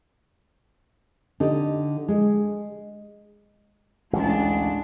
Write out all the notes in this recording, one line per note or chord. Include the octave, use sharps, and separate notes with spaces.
D3 D#4 G4
G#3
A1 D2 G#3 D4